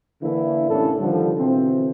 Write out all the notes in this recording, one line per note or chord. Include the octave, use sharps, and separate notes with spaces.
D3 E3 A#3 D4 E4
A2 C3 A#3 C#4 D4 A4
D3 D#3 F3 G3
B2 D3 E3 C4